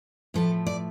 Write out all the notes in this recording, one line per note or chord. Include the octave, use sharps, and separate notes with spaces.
A2 F3 A3 A4
D5